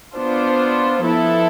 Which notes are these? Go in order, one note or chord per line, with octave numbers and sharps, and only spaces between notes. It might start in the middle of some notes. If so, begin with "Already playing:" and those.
B3 D4 F4 C5
F3 B3 E4 A4